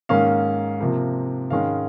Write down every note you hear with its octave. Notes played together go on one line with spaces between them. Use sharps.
G#2 D#3 A#3 C#4 F5
C3 F3 A#3
G#2 D#3 G#3 C#4 F5